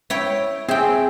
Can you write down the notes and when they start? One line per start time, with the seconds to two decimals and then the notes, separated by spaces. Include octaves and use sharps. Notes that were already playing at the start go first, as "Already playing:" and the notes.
0.10 E4 C#5 G5
0.68 C4 G#4 E5 G5